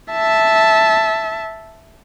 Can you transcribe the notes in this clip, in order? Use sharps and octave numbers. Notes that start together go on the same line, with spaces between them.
E5 A5